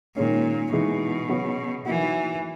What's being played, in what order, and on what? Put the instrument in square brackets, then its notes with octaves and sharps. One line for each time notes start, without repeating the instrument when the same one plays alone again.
[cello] A#2 [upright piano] D#3 G#3 C#4
[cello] B2 [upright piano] E3 G#3 D#4 G#4
[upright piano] C#3 F#3 B3 F#4
[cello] E3 [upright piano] F#3 A#3 D#4 F#4